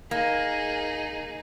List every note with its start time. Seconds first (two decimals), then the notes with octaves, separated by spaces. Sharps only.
0.11 A#3 D#4 G#4